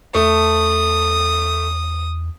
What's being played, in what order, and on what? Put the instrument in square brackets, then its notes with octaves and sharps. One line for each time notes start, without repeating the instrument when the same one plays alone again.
[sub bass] E2 [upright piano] A3 [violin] D#6